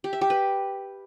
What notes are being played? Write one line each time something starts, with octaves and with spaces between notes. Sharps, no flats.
G4
E5
G4
B4